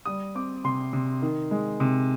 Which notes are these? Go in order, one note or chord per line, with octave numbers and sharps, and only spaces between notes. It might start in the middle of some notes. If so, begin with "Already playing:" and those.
G3 D#6
C4 D6
C3 C6
C3
D#3
G#3
C3